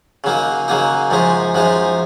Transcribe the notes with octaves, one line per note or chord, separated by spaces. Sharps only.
C#3 F#3 A#3 D#4
C#3 F#3 A#3 D#4
F#2 F3 G#3 D#4
F#2 F3 G#3 D#4